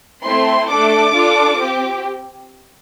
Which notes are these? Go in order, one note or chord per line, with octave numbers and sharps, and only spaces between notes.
A3 C4 E4 C6
A3 D4 A4 D6
D4 F4 A4
C4 G4